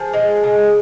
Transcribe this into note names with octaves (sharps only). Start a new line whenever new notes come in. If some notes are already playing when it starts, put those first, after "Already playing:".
Already playing: F3 G#4
G#3
C#3